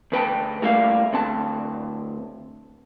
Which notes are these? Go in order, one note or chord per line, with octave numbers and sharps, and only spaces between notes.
D2 B4 G5 A5
A2 G3 A#3 E5 F5
D2 C4 A5